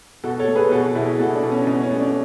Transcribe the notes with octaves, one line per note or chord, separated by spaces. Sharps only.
B2 F#4 A4
A4 C#5
A3
G#4 B4
B2 F#4 A4
B2 E4 G#4
A3 F#4 A4
D4
B2
C#4
B2 C#4
C#4
A3
D4